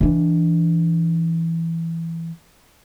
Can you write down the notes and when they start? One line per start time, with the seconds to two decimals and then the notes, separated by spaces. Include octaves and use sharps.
0.01 E3 D4